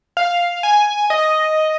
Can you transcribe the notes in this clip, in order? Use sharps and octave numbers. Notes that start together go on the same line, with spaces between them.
F5
G#5
D#5